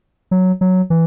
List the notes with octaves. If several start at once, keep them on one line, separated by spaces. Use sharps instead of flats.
F#3
F#3
E3